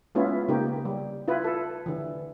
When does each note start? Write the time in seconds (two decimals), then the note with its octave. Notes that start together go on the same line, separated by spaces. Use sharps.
0.15 G#3 B3 C#4 E4 F4
0.48 C#3 A#3 D#4 G4
0.85 G3
1.28 E4 F4 B4
1.44 A4
1.86 D3 E3